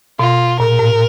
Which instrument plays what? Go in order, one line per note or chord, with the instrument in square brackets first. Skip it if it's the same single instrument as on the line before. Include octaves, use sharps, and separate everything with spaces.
[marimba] B2 [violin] F4
[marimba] A#2 [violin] A#4
[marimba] A2